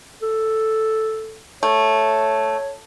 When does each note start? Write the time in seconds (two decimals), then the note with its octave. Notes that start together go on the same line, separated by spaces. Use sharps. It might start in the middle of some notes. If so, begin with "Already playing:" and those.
0.22 A4
1.63 A3 C#5